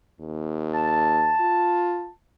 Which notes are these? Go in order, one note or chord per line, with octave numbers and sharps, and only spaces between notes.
D#2
A5
F4